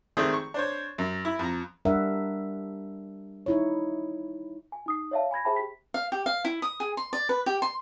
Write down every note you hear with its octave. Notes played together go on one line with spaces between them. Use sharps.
D#3 A3 C4 G#4 D5
C#6
D4 C5 C#5
F#2
E4
F2 A#5
G3 D4 A#4 E5 F#5
D#4 E4 C#5
G#5
D#4 D#6 C7
C#5 D5 E5 F5 A5
G#5 B5 G#6 A#6
G#4 C5 E5 G5 A5 B5
G4 B6
F5
G4
F5
E4
D#6
G#4
C6
D5
B4
G4
C6